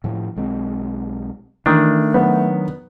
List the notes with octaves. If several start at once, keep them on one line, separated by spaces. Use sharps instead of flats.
A2 F3
B1 G#3 C4
D#3 E3 A3 D4
F#3 B3